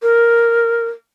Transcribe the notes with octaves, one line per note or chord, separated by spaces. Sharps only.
A#4